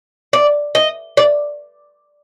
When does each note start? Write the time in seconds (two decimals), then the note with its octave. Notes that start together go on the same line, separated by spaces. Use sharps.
0.33 D5
0.75 D#5
1.17 D5